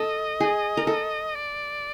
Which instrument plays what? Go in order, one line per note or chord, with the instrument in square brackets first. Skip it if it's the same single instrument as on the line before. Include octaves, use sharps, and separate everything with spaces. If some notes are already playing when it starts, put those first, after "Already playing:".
Already playing: [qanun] A4 [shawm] D#5
[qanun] G#4
A#4
A4
[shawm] D5